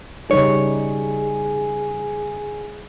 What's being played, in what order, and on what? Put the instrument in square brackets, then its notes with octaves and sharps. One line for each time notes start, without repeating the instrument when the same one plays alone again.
[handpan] C#3 G3 D#4 [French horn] G#4 [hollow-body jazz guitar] C#5